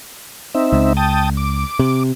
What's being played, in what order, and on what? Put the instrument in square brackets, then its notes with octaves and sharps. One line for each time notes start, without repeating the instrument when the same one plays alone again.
[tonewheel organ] C4 D#4 E5
[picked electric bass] C#2
[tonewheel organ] G5 A5 D#6
D6
[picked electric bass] C3